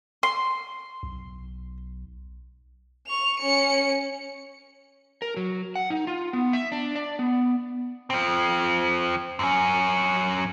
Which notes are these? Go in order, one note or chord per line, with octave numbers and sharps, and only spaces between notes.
C6
B1
C#6 F7
C#4 C#7
A#4
F#3
F#5
D#4
F4
B3
E5
D4
D5
B3
F3 C4
F#2 C#4